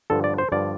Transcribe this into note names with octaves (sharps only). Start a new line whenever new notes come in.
G2 D3 F3 A4
D5
C5
G2 D3 F3 D5